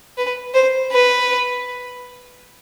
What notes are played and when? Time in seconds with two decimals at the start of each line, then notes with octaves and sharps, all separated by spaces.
0.17 B4
0.54 C5
0.92 B4